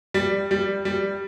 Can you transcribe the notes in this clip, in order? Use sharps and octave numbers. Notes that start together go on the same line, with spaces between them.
G3
G3
G3